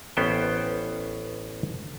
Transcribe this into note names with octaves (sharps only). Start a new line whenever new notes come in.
A1 B3 C#4 C5 G5